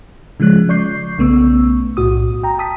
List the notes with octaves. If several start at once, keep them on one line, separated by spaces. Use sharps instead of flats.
C#3 F3 G#3 F#6
D5 C#6 G6 C7
B1 C#3 A3 B3 C#6 E6
B1 A2 F#4 D#6
G5 A#5
A5 D#6 B6